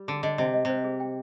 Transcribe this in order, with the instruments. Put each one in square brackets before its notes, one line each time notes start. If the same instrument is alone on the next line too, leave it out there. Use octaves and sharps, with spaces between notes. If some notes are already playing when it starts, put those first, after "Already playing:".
Already playing: [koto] G3
[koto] D3 [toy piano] G#4
[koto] D3 [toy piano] D#5
[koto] C3 [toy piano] D#5
[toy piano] D#5
[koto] C3 [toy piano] C5
[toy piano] G#4
G5